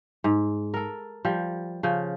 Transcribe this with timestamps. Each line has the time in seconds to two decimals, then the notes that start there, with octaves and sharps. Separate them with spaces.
0.24 G#2
0.74 A4 A#4
1.25 F3 G3
1.83 C#3 F3